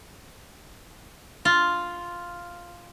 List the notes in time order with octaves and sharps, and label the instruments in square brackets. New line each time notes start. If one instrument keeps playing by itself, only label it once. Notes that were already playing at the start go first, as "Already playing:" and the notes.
[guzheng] F4